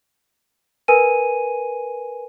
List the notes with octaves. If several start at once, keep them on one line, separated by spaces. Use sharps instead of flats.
A#4 B4 G#5 D#7